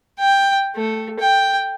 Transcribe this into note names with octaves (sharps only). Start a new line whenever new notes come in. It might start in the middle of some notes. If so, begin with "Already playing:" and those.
G5
A3
G5